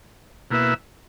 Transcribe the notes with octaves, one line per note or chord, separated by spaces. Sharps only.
B2 A#3 E4 B4 E5